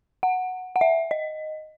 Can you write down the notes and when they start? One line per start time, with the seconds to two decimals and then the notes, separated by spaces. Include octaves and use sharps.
0.23 F#5
0.76 F#5
0.81 E5
1.11 D#5